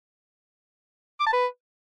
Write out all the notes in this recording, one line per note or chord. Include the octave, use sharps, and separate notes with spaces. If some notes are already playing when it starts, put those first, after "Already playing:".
D6
A5
B4